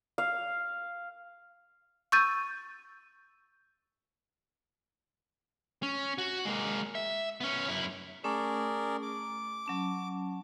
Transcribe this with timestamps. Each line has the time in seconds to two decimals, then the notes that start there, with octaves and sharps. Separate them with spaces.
0.18 F5
2.12 C#6 E6 G6 A6 D#7
5.83 C#4
6.18 F#4
6.45 G#3 A#3
6.95 E5
7.41 B3 C#4
7.68 F#2 E4
8.24 A3 C#4 G#4 A#4 D5
9.02 D6
9.66 F#3 C#4 A5